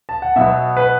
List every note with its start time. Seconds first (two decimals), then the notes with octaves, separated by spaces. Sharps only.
0.09 A5
0.22 F#5
0.36 B2 F#3 B3 E5
0.77 B4